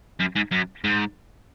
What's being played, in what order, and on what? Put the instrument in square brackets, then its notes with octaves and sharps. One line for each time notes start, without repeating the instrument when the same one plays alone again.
[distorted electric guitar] F#2
G#2
F#2
G#2